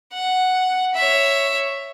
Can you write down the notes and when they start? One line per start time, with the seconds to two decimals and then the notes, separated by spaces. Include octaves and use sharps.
0.14 F#5
0.95 C#5 E5